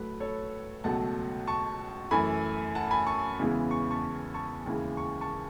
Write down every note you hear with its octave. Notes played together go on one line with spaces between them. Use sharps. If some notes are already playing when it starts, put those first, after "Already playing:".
Already playing: A2 F#3 A3 B4
A4 C#5
C#2 B2 F#3 A3 F#5 A5
A5 C#6
F#2 E3 A3 G#5 B5
F#5 A5
G#5 B5
A5 C#6
E2 C#3 E3 G#3 B3
C#6
A5 C#6
A5 C#6
D#2 C#3 E3 G#3
C#6
A5 C#6